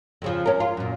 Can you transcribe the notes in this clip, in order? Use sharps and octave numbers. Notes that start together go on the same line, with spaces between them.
F2 C#3 F3
C#4 A#4
F4
F#2 A#2